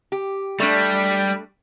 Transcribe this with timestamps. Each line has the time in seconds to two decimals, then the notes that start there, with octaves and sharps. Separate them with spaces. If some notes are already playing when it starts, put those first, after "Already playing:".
0.12 G4
0.60 G3 A3 D4